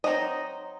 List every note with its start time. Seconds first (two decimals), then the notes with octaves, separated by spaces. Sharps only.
0.04 F#3 C4 D#4 D#5